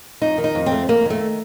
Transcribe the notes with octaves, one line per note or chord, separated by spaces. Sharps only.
F2 D#4
D#3
D#4
F2
C4
A3
F2 A#3
D#3 A3